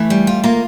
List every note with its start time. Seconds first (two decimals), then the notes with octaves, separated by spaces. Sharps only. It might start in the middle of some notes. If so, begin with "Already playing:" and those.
Already playing: E3 A3
0.10 G3
0.27 F4
0.44 A#3 F4